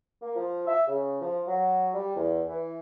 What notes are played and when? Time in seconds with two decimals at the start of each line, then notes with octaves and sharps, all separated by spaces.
0.22 A#3
0.36 F3
0.67 E5
0.87 C#3
1.21 F3
1.47 F#3
1.94 G3
2.16 E2
2.48 E3